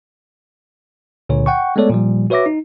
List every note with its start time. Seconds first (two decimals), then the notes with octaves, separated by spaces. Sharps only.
1.29 C#2 A#2 D3 C#5
1.46 F#5 G5 C#6
1.76 G#3 A3 B3 A4 C#5 D5
1.90 A#2 F3 G3
2.30 F#4 B4 C#5 E5 D6 A#6
2.46 D#4